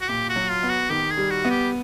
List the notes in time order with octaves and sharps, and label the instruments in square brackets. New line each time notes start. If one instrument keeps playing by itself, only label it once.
[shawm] F#4
[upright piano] A#2 [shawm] G4
[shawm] F#4
[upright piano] F#3
[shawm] F4
[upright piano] B3
[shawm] F#4
[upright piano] D#3 [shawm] G4
[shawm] G#4
[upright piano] G3
[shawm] F#4
[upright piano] B3
[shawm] G4